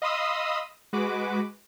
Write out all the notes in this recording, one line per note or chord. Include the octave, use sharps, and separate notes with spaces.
D#5 F5 B5 C6 D#6 E6
G#3 F#4 B4 D6